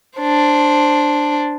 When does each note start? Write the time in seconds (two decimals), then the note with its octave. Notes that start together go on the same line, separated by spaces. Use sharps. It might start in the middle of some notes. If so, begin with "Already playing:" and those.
0.19 D4 C5